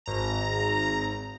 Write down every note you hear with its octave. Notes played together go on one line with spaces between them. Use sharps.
G#1 A#5